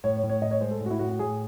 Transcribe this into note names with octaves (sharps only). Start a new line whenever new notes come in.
A2 C#5
C#5
A2
C#5
A2 D#5
C#5
G#3 C5
A4
A2
F#4
E4
A2 F#4
F#4
A2 G#4